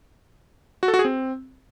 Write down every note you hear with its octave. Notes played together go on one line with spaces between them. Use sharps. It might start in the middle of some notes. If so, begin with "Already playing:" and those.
F#4
A4
F#4
G#4
C4